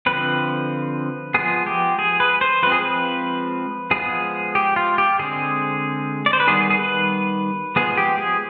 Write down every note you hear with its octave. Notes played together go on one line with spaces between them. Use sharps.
D3 F3 C4 B4
F3 G#3 B3 G#4
G4
G#4
B4
C5
F3 G#3 C4 B4
G#4
B4
F3 G#3 B3 G#4
G4
F4
G4
D3 G#3 C4 G#4
D5
C5
B4
D#3 G3 B3 G#4
G#4
B4
F3 G#3 B3 G#4
G4
G#4